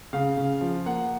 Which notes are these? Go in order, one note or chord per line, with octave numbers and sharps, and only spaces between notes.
C#3 F5
C#3
F3
A#3 F#5